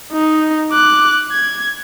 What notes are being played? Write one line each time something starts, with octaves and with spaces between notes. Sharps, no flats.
D#4
D6 F#6
G#6